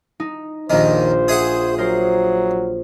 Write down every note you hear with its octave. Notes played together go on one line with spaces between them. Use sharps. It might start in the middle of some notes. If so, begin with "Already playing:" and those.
D#4
A#1 D#2 D#3 D4 C5
G#4 E5 F#5
F#3 A#4 C5